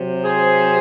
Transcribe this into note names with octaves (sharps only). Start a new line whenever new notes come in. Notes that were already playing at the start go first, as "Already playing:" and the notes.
Already playing: C3 F#3
G#4 C5